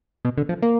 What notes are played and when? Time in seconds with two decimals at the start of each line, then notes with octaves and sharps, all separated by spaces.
0.25 B2
0.38 D3
0.49 F3
0.62 A#3